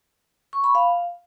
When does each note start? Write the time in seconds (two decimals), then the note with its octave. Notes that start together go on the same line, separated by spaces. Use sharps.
0.53 C#6
0.64 B5
0.75 F5